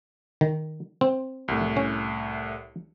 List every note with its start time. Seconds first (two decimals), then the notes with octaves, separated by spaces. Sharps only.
0.41 D#3
1.01 C4
1.48 C2 A2
1.77 C#4